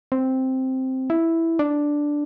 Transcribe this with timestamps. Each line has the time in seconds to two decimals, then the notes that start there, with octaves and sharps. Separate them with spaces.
0.12 C4
1.10 E4
1.59 D4